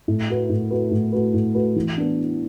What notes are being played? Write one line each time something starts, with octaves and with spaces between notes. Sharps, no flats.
A2
A3 F#4 B4
A2
A3 F#4 B4
A2
A3 F#4 B4
A2
A3 F#4 B4
E3
B3 D4